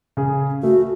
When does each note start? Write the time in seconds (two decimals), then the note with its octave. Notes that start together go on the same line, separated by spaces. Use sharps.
0.17 C#3 G#4
0.63 A3 F#4